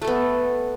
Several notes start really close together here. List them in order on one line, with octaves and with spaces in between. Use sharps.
A3 A4 B3